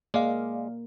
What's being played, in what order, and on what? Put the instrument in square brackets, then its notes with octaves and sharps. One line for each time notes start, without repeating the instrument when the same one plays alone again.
[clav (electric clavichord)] G#3 [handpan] A#3 [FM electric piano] D5 F5